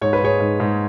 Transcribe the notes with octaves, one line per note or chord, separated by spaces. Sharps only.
G#2 C#5
B4
G#2 G#4 C#5
G#2
G#2